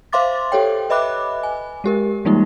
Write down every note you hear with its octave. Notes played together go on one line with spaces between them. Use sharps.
C5 E5 F5 C6 D6 A6
G4 A4 C#5 G5
B4 D#5 E5 B5 D6 F#6
G#5
G#3 G4 A#4
E3 G3 G#3 A#3 D#4 F4